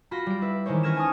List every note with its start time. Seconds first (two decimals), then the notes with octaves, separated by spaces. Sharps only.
0.11 F4 F#4 B5 C6 A#6
0.26 G3 D7
0.41 E4 B4 E5
0.66 D#3 E3 G#3 G4 C5 C#5
0.83 C#4 B4 F6 G#6 A#6 E7
0.97 G#5 A5 C#6 D#6 F6